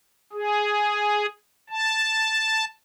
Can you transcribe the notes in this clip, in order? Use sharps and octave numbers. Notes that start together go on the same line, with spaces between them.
G#4
A5